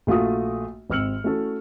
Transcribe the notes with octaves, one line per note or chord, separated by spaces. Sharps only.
A#1 A3 F4 F#4 D#6
G#1 C4 E6 F6 C#7 F#7
A3 C#4 E4 F#4 A4